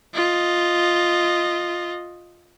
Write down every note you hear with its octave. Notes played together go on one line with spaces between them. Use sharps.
F4 D#5